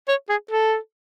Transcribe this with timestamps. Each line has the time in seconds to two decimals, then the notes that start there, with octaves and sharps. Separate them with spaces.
0.08 C#5
0.29 G#4
0.51 A4